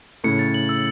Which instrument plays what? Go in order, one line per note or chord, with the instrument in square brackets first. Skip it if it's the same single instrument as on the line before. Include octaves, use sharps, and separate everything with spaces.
[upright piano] A2 C#3 [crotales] C#7
[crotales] A6
F#7
E6